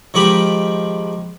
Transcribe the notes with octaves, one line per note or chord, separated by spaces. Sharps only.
D#3 F3 G#3 G4 B5